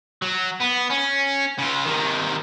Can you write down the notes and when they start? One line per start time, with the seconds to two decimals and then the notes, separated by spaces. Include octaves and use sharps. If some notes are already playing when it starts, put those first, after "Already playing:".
0.22 F#3
0.61 B3
0.91 C#4
1.59 C#3 F4
1.85 C3 D#3